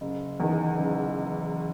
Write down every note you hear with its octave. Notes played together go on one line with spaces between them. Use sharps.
F#1
E2 D#3
F#1